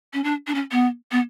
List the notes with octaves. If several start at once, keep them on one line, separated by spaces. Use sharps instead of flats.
C#4
D4
D4
C#4
B3
B3